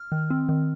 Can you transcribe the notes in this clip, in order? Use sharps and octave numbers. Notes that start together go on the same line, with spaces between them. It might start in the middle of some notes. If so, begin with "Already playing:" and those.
Already playing: F6
D#3
C4
D#3